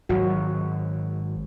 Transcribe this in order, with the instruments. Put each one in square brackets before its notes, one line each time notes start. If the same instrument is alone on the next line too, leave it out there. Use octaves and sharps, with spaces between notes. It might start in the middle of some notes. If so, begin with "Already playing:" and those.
[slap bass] G#1 [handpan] F#3 F#4